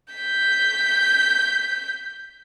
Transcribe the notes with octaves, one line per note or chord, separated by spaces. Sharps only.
G6 B6